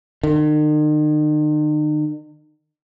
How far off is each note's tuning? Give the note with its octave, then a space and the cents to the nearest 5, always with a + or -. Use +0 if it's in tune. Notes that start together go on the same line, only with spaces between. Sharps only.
D#3 -45